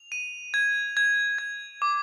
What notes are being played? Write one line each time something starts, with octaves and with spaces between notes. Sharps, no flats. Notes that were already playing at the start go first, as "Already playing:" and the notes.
Already playing: F7
D#7
G#6
G#6
G#6
D6